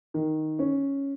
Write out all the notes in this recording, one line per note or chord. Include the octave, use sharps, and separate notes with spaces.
D#3
C#4